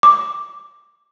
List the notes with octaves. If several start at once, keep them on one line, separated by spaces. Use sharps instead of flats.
D6